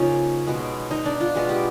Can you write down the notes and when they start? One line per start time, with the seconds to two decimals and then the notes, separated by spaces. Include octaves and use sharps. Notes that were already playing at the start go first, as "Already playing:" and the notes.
Already playing: C#3 F3 A#3 C#4 D#4 F4
0.47 B2 G#3 B3
0.91 D#4
1.05 D4
1.21 F4
1.35 B2 G#3 B3
1.49 G4